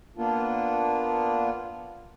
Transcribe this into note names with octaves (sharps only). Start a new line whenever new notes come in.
A#3 B3 D4 F4